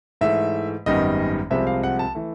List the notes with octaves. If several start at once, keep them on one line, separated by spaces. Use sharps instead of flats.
G#2 E3 A3 E5
G#1 F#2 D#3 G3 B3 D#5
C2 C3 F3 G#3 C4 E5
F5
F#5
A5
E3 A3